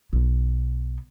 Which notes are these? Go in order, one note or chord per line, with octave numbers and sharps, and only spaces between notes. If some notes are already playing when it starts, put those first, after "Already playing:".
B1 B2